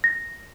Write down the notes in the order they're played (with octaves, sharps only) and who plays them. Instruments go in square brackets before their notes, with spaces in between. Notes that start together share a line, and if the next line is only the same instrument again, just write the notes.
[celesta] A#6